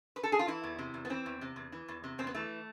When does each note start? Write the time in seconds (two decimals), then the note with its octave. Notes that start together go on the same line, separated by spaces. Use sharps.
0.16 B4
0.23 A4
0.32 G#4
0.39 F4
0.47 E3 E4
0.64 E2
0.79 C3
0.94 E2
1.05 B3
1.10 E3 C4
1.26 E2
1.41 C3
1.56 E2
1.72 E3
1.88 E2
2.04 C3
2.18 E2 C4
2.27 B3
2.35 E3 A3